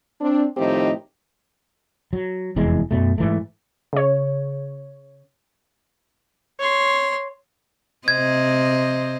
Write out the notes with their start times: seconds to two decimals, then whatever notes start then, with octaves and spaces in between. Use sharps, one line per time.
0.21 C4 D4
0.57 A2 D#3 F3 C4 D#4 G4
2.13 F#3
2.56 F1 E2 E3 G#3
2.91 F#2 B2 A3
3.18 G#2 E3 A3
3.93 C#3 C#5
6.60 C#5 C6
8.08 C3 C5 D#5 G#6